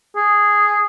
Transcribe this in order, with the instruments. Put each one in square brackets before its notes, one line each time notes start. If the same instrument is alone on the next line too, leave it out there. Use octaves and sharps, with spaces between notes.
[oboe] G#4